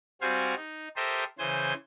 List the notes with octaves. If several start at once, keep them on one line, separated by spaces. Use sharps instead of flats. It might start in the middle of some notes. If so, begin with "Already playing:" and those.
G3 C4 F#4 C5 F5 G#5
D#4
G4 A4 A#4 C5 D#5 E5
C#3 E3 C5 G#5 G6